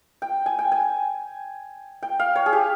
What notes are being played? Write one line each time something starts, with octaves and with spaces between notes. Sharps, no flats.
G5
G#5
G5
G#5
G5
F5
C#5
G#4
G4